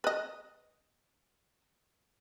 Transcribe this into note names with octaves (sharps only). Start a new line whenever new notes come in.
B4 D#5